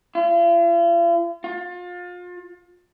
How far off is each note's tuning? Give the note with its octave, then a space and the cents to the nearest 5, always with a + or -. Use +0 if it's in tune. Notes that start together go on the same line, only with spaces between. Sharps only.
F4 -45
F4 +30